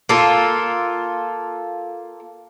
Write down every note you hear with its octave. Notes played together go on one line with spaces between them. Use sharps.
A#3 F4 A4